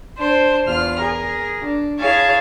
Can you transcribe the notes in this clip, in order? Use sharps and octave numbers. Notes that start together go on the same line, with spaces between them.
D4 C5
E2 F4 F6
G#4 A#4
D4
E4 G#4 C#5 F5 A5